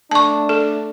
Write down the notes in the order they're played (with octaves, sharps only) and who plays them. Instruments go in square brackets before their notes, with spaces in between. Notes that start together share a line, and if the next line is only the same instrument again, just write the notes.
[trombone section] A3 D4 [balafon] A5 C#6
[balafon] A4